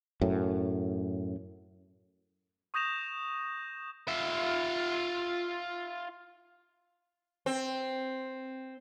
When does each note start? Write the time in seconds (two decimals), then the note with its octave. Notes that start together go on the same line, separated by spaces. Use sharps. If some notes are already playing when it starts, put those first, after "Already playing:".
0.21 F#2 A2
2.74 C#6 D#6 G6 A#6 E7 F7
4.08 F4 E5
7.46 C4